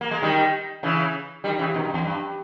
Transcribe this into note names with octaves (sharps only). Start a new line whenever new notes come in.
A#3
G#3
D#3 G3
C#3 E3
D#3 G3
C#3 E3
B2 D#3
G2
E2
G2